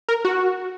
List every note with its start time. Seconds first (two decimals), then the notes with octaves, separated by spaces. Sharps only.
0.09 A#4
0.25 F#4